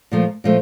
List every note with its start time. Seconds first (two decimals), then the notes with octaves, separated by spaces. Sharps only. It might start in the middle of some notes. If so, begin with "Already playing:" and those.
0.12 A#2 F3 A3
0.44 A#2 F3 A3